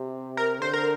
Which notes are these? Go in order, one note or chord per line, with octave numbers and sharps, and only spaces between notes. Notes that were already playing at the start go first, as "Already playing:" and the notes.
Already playing: C3
A#4
D3 C5
A#4